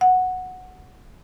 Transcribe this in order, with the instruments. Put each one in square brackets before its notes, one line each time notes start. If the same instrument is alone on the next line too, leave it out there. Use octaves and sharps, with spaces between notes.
[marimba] F#5